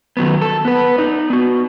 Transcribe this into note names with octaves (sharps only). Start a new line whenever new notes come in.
D#3 F#3 B3
A4
B3 B4
D#4 D5
B3 F#4